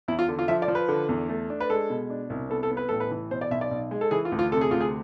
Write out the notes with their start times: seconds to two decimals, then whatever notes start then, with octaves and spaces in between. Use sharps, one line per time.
0.08 E2 E4
0.19 F4
0.28 D3
0.39 F4
0.48 F3 E5
0.62 D5
0.68 F3
0.75 B4
0.88 D3
1.09 E2
1.29 A3
1.50 D4
1.60 B4
1.70 G#3 A4
1.90 B2
2.10 D4
2.30 C2
2.50 B3 A4
2.63 A4
2.71 B3
2.77 B4
2.89 A1 A4
3.00 B4
3.11 E3
3.31 B2 C5
3.41 D5
3.51 B1 E5
3.61 D5
3.71 B1
3.91 G#3
4.01 A4
4.11 E3 G#4
4.25 F4
4.32 D2
4.39 F4
4.52 C3 A4
4.61 G#4
4.71 D2 F4
4.81 G#4